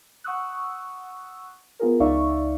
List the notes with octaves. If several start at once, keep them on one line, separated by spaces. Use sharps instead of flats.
F#5 C#6 D#6 E6 F#6
B3 F4 G#4 A#4
C#2 D#4 D5 E5 F5 C#6